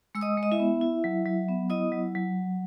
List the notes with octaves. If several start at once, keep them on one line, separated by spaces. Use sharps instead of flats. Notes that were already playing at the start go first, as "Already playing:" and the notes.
G#3 E6
D#5 D#6
G#3
D#5
E4 E5
B3
E4
F#3
F#3
B3
E4 D#5 D#6
F#3
F#3